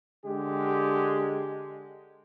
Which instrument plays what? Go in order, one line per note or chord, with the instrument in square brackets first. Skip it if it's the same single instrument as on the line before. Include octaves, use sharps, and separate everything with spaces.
[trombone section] D3 G#3 G4